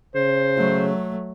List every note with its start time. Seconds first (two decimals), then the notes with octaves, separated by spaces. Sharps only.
0.15 C#3 C5
0.57 F#3 A3